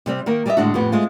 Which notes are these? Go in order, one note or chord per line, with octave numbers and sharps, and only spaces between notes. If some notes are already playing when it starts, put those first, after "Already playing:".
C3 G3 C4
D#3 A#3 A#4
G3 G4 G#4 C#5 D#5 E5
A2 D3 G#3 D4 F#4
F2 A2 B3 G4
G#3 A3 C4 F4